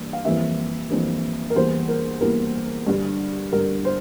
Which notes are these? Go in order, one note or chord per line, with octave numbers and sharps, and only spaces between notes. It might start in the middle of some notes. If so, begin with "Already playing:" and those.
Already playing: G2 E3 G3 A#3
F5
F2 E3 G3 A#3 E5
F2 E3 G3 A#3
A#4
E2 E3 G3 A#3 C5
A#4
E2 E3 G3 A#3 A#4
G2 D3 G3
G2 D3 G3 A#4
C5